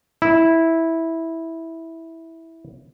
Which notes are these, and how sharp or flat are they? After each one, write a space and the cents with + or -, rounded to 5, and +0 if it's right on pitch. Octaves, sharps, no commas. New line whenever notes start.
E4 -10